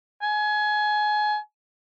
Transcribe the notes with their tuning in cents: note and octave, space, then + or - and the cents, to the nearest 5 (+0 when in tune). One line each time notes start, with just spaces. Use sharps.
G#5 +25